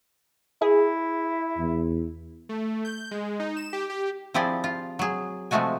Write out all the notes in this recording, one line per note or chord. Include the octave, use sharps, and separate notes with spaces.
E4 G#4
E2
A3
G6
G#3
D#4
E7
G4
G4
F3 C4 E4 G4 G#4 D5
F4
F#3 G#4
C3 F3 G#3 A3 F#4 G#5